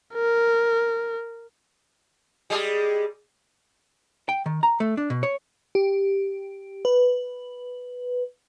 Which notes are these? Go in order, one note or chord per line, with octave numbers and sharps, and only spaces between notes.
A#4
G3 G#3 G#4
G5
D#3
A#5
A3
D4
B2
C#5
G4
B4